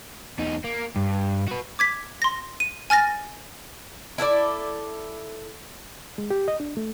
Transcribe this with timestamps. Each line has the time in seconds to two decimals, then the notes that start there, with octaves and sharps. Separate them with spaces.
0.39 E2 D#4
0.64 A#3
0.96 G2
1.48 F#4 B4
1.79 D6 G#6 B6
2.22 C6 A#6
2.60 D#7
2.90 G#5 F6 A6 A#6
4.18 E4 A4 B4 D5
6.18 G#3
6.30 G4
6.48 D#5
6.60 D4
6.77 A3